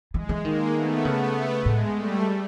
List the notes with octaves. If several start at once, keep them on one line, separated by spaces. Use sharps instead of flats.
E3 G#3
E3
D#3 G#3 A#3
A3 B3
C#3
A2 G#3
G3 A3